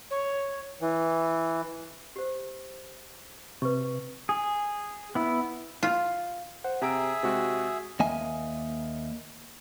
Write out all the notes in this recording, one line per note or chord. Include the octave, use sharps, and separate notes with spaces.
C#5
E3
G4 C5
C3 B4 C#6
G#4
B3 E4
F4
C5 F#5
C3 G#4 E5 A#5 D7
C3 G#3 F#4
D#2 A#3 D#5 E5 G#5